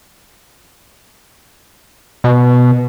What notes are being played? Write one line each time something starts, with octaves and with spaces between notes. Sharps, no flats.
B2